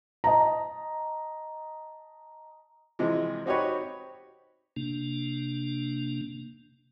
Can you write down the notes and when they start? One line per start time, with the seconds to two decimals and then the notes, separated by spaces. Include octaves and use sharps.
0.24 D#5 A5 A#5
2.99 C3 E3 F3 G#3
3.46 C4 D#4 F#4 G4 B4 C#5
4.76 C3 A#3 D4